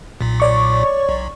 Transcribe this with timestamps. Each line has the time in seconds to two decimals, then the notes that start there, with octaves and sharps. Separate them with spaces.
0.21 B1 A#2
0.40 C#5 D5 C#6
1.09 B1